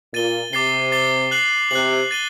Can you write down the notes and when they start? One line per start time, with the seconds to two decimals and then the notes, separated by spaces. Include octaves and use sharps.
0.13 A#2 A6 D#7 G7
0.53 C3 D6 A6 C7 G7
0.92 D6 A6 C7 G7
1.31 F#6 C7 F#7
1.71 C3 F#6 C7 F#7
2.11 A6 D#7 G7